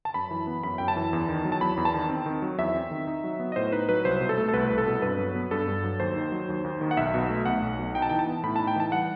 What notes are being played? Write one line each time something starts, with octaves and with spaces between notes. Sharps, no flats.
A5
F#2 B5
E3
B3
F#2 B5
F#2 G5
A5
E3
E2
D#3
F#3
A5
E2 B5
E2
A5
D#3
C4
D#3
F#3
E2 E5
C4
D#3
D#4
F#3
B3
D#5
A2 C5
D#4 B4
F#3 B4
C2 C5
B2
A4
A3
A4
C2 B4
C2
A4
B2
G2 B4
F#3
B3
G2 A4
G2
F#3
D#2 C5
D#3
F#3
D#2
D#2
D#3
F#5
B1 E5
B2
A3
B1 F#5
B1
B2
D#4 G5
A5
E3 G5
A5
B3
A2 B5
D#4 A5
G5
E3 A5
G3 F#5